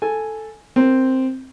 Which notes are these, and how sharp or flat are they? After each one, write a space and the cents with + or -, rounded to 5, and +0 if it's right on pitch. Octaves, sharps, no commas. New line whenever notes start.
A4 +0 G#5 +0
C4 +0 A#4 -5